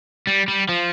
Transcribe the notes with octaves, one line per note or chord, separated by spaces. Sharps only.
G3
G3
F3